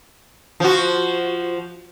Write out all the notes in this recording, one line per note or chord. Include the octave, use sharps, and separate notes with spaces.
F3 F#4